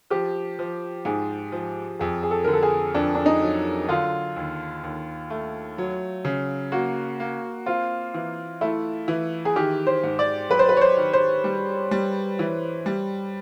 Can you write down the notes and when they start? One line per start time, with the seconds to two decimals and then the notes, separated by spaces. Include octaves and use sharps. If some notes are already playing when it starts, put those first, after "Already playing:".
0.10 F3 G4
0.59 F3
1.05 G#2 G#4
1.52 F3
1.99 F2 G#4
2.23 G#4
2.31 A4
2.44 D3 A#4
2.53 A4
2.63 G#4
2.94 F2 D4
3.15 D4
3.26 D#4
3.41 F#3
3.88 D3 F4
4.36 D#2
4.84 D#2
5.30 A3
5.78 F#3
6.25 C#3
6.72 A#3 F#4
7.20 A#3
7.66 C4 F4
8.14 E3
8.61 A3 E4
9.08 E3
9.45 G#4
9.56 D#3 G4
9.87 C5
10.04 G#2
10.19 D5
10.50 F#3 B4
10.59 C5
10.69 B4
10.77 C#5
10.81 C5
10.97 D#3
11.13 C5
11.44 G3
11.91 G3
12.39 E3
12.86 G3